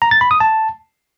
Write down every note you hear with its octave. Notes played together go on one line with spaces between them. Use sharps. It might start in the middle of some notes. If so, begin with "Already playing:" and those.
A#5
A6
B5
D#6
A5